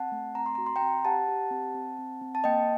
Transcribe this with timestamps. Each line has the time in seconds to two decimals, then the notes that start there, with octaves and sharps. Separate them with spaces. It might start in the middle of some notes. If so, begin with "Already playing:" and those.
Already playing: C4 F#5 A5
0.12 A3
0.35 C4 A#5
0.46 C6
0.55 F#4 A#5
0.66 C6
0.76 G5 A#5
0.82 C4
1.05 G4 F#5 A5
1.28 G4
1.51 C4
1.74 C4
1.98 C4
2.21 C4
2.35 A5
2.44 A#3 D#5 G5